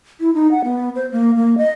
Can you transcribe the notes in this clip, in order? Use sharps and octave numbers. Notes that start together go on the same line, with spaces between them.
E4
D#4
F#5
B3
C5
A#3
A#3
D#5